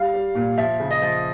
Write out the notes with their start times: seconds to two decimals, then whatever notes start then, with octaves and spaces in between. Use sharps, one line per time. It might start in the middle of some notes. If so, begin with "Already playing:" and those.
Already playing: G3 F5
0.14 G3
0.35 A#2
0.58 F3 E5
0.80 C#3
0.91 D#5
1.02 F3